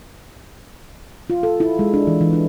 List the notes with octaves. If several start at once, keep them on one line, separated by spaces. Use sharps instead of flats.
F4
A4
E4
G#3
D4
E3
E3
D4